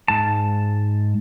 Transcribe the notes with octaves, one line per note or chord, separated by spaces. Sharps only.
G#2 A5